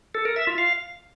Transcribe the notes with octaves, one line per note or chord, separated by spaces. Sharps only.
A4
A#4
E5
F4
F5